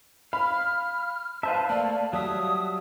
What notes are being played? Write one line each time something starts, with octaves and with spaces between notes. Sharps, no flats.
F5 B5 F6
B4 C5 E5 F5 A5
A3 A#3 D5
F#3 G3 E5 D#6